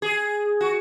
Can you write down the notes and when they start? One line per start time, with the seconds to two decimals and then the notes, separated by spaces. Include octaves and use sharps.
0.02 G#4
0.61 F#4